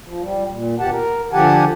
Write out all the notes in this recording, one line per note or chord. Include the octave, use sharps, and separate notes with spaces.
F3
G3
A#2
D#2 B2 G4 F#5 A5
A#4
D3 F3 G4 F#5 G#5 A5